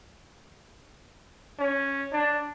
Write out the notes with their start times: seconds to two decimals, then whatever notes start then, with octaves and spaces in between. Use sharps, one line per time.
1.59 C#4
2.13 D4